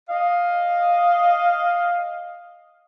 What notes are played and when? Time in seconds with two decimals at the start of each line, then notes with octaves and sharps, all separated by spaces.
0.09 D#5 F5